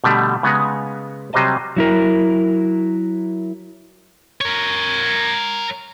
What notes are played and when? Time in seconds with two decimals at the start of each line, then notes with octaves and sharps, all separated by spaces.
0.04 B2 D3 G3 A3
0.43 C#3 G#3 B3 F#5 G#5 A#5
1.33 C3 F#3 G3 C5 D#5 A5
1.77 F#3 E4 A#4
4.41 A#4 C#5